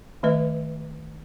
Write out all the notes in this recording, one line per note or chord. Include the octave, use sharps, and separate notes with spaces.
D#3 A3 B4 D#5